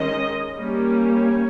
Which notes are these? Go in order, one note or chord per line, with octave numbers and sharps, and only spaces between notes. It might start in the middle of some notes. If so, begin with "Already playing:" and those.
Already playing: D#3 G#3 C#4 D#5
G3 A#3 C#4
C#5